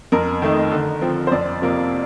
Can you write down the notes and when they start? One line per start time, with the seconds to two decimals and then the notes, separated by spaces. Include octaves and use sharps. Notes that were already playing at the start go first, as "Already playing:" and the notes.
0.12 F2 A#4
0.42 D#3 A3 D#4
0.72 D3
1.02 F3 C4
1.27 C5
1.32 F2 D5
1.62 C3 F3 A#3